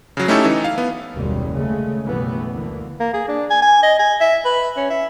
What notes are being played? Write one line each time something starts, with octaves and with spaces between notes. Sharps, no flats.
C#3 F#3
A3 C#4 D#4 E4 G4 A4
E3 D#4
F5
B3
F#1 D#2 B2 G3 G#3
C#3 G#3 A3
B1 F#2 E3 G3 A3 B3
D2 D3 E3 A#3
A#3
G#4
D4
G#5
G#5
D#5
G#5
E5
B4
C#4
E5